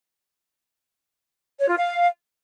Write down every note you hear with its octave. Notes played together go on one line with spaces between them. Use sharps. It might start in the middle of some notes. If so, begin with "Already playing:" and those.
C#5
F4
F5